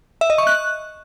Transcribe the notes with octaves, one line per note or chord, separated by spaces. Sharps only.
E5
D#5
C#6
F#6